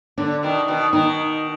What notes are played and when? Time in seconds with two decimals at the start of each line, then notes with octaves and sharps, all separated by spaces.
0.18 D3 D4
0.43 B2 D#3
0.67 B2 D#3
0.93 B2 D#3 D#4